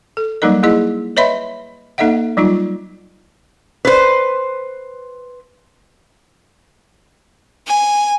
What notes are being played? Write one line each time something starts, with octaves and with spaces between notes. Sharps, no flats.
A4
F#3 G3 A#3 D#4 A#4 D#5
A#3 E4 G#4 D#5
B4 C#5 D#5 E5 B5 C6
A#3 D#4 A4 D#5 E5 F#5
F#3 G3 D#4 F4
B4 C5
G#5